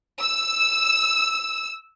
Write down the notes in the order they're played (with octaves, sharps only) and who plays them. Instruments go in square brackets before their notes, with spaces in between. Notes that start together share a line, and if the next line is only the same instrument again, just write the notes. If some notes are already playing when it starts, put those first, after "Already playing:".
[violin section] E6